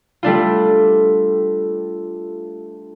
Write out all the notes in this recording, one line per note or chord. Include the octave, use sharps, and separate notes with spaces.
G3 A3 D4 F4